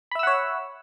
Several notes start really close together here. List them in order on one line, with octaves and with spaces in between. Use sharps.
B5 E5 E6 F#5 C#5